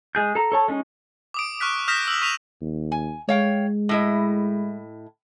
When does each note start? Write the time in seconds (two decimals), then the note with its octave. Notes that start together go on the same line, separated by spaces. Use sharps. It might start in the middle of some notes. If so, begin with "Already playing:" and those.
0.15 G#3 G#4 G6
0.35 A4 A#5
0.52 A4 C#5 A5
0.68 G#3 C#4 D#4
1.34 D6 D#6 D7
1.60 C#6 F6 F#6 B6
1.88 D#6 F6 G6 A#6 B6 E7
2.08 E6 F#7
2.22 C#6 B6 D#7 F7 F#7
2.61 D#2
2.92 G#5
3.29 G#3 C#5 F5 G5
3.89 A2 E4 D#5